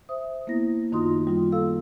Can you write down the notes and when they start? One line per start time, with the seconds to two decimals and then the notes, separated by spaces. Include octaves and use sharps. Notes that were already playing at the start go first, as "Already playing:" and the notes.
0.09 C5 E5 D#6
0.47 A#3 B3 E4 A#6
0.92 F#2 D#3 D#4 F4 C6 D#6
1.27 G3 F4
1.52 A#3 A4 F5 E6